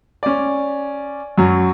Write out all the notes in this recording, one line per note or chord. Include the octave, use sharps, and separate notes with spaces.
C#4 D5
F#2 F#3